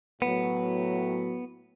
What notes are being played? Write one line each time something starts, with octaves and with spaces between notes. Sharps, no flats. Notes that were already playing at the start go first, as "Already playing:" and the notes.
A2 F#3 B3